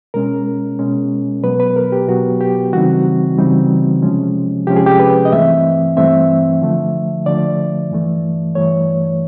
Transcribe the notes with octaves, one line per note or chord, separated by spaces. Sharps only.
B2 G#3 C#4 A#4
B2 G#3 C#4
B2 F#3 B3 B4
B4
A#4
G4
B2 F#3 B3 F#4
G4
C#3 E3 G3 C4 D#4 F#4
C#3 E3 G3 C4 D#4
C3 F3 G#3 C#4
C3 F3 G#3 C#4 G4
G#4
G4
B4
D#5
G2 E3 A3 C4 E5
G2 E3 A3 C4 E5
D3 F3 A3
D3 F3 A3 D5
G2 E3 A3
G2 E3 A3 C#5